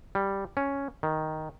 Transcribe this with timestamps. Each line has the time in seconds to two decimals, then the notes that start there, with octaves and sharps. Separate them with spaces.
0.15 G3
0.57 C#4
1.03 D#3